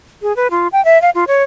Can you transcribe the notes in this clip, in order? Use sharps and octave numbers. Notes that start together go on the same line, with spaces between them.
G#4
B4
F4
G5
E5
F5
F4
C#5